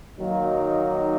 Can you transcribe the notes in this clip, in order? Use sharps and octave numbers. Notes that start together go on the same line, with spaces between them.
D#3 F#3 A#3 D#4